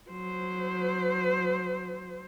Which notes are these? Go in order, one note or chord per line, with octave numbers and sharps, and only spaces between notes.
F#3 C5